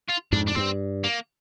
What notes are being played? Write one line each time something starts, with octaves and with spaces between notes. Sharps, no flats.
F4
F2 G#2 D4
D4
G2 C4
A#3